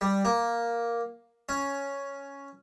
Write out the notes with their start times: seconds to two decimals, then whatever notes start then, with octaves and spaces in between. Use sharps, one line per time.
0.01 G3
0.25 A#3
1.49 C#4